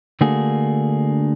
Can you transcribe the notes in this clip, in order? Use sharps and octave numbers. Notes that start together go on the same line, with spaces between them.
D3 A3 A#3 D4 F#4 G#4